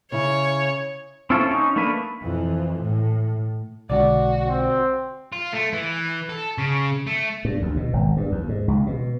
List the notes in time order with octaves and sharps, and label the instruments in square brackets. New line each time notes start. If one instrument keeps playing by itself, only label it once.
[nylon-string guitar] C#3 E4 [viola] C#5
[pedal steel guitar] C4 C#4 E4 F4 A4
C#4 D#4
A3 A#3 D4 B4
[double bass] F2 E3
A2
[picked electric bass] B1 D3 G#3 [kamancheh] F#4 [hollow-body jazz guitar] D5
[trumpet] C4
[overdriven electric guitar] F4
A3
E3
A4
C#3
A3
[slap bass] G2
D2
B2
G#1
G2
D#2
G#2
C#2
B2